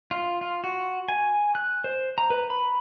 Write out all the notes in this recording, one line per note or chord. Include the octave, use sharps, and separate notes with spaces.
F4
F4
F#4
G#5
F#6
C5
A#5
B4
B5